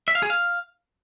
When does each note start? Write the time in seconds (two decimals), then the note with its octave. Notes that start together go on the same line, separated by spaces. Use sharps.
0.08 E5
0.15 F5
0.23 G#4
0.30 F5